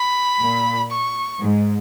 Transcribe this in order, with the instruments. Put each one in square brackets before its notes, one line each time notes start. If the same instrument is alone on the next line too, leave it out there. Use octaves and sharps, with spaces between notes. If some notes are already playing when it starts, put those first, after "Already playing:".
Already playing: [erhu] B5
[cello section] A#2
[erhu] C#6
[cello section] G#2